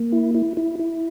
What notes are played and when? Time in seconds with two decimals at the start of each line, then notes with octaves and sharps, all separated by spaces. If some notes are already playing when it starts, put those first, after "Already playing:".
Already playing: A#3
0.12 E4
0.35 E4
0.57 E4
0.79 E4